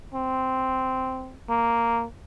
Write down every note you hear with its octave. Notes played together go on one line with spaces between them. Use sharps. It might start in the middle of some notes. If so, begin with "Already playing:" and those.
C4
A#3